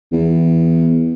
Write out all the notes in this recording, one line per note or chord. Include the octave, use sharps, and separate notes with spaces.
E2